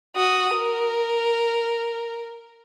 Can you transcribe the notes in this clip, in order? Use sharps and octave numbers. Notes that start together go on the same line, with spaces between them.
F#4 D#6
A#4